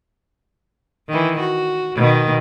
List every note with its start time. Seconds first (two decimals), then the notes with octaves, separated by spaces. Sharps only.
1.08 D#3 E3
1.40 F#4
1.95 B2 D#3